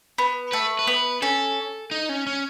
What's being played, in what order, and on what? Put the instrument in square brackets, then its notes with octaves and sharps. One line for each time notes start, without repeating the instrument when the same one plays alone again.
[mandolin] B3
[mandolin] A3 [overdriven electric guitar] B4
[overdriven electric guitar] B4
[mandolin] B3
[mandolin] C#4 [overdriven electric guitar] A4
[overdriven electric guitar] D#4
C#4
C#4